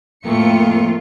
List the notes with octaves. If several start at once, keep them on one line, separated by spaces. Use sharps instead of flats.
F2 A2 A3 A#3 F4 C#7